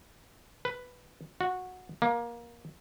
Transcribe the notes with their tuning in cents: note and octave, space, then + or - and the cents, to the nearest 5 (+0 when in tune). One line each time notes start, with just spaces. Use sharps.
B4 +5
F#4 -15
A#3 +20